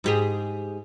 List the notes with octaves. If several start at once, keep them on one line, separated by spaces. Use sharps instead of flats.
G#2 G4 G#4